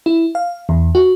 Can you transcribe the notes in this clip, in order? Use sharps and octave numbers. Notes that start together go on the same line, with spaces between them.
E4
F5
E2
F#4